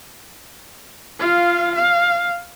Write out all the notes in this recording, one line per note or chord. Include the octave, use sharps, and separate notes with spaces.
F4 F5
F5